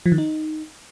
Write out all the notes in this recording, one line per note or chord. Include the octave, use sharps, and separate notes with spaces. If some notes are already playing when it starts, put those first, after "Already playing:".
F3
D#3
D#4